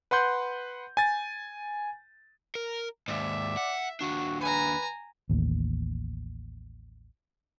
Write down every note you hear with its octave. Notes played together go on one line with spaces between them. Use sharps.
B4 F#5 C6 G6
G#5 A6
A#4
D#2 G#2 D5 E5
F#5
D#2 D4 F#4
B4 G#5 A#5
A1 D#2